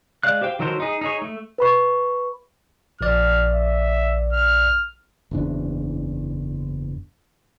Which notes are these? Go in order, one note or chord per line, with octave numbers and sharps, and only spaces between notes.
G#3 D5 F5 F#6
G4 C5 F5 G5
D#3 F#3 A4 A#4 C5
D#4 G#4
D#4 G#4 C#5
A3
B4 B5 C#6
A#1 D5 F6
E5
F6
F#1 E2 D4